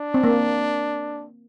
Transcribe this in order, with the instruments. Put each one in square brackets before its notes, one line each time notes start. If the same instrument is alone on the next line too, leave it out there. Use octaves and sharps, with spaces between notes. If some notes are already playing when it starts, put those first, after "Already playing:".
Already playing: [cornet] D4
[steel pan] C4
A#3